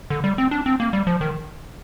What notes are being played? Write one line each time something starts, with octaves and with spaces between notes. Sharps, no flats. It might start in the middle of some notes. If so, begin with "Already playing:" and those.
D3
G3
C4
D4
C4
A#3
G3
F3
D#3